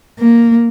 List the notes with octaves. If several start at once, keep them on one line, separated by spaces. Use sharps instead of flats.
A#3